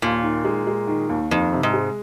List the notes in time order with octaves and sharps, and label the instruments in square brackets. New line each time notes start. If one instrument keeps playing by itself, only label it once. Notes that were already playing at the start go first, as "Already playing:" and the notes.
[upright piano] D#2 [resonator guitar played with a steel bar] A#2
[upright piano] D#3
G#3
G#3
D#3
D#2
[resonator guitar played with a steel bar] F2 [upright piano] D#3
[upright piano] C3
[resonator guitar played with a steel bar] G#2
[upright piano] G#3